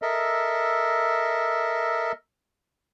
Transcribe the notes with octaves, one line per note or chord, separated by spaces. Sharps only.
A4 A#4 D#5 E5